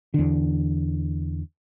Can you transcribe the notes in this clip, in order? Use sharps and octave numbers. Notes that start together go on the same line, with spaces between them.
E2 D3